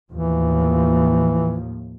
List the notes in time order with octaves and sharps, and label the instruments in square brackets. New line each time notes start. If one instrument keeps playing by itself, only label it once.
[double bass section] D#2 A2 F3 [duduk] E3